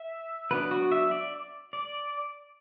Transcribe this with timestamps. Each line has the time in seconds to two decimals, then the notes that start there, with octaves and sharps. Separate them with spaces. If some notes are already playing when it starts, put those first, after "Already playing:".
Already playing: E5
0.51 F#3 B3 D4 B4
0.71 F#4
0.92 E5
1.11 D5
1.73 D5